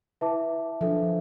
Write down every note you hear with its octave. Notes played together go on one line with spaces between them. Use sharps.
E4 B4 E5 A5 D6
F3 D4 A4 E5